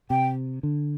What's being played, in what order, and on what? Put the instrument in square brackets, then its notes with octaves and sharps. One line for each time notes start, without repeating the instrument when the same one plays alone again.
[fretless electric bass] C3 [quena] G5
[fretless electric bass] D3